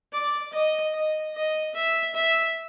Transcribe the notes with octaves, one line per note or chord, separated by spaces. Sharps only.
D5
D#5
D#5
D#5
E5
E5